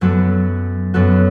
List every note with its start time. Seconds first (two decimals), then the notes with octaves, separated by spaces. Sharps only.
0.01 F#2 F#3 B3 F#4 A4
0.94 F#2 F#3 B3 F#4 A4